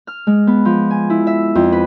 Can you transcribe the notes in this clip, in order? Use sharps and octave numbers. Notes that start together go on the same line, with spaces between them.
F6
G#3
B3
F3
G#5
E4
E5
F2
B4